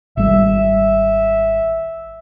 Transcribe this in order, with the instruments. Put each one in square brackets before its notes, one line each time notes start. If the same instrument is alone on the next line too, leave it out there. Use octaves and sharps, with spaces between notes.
[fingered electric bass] G#1 G3 [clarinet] E5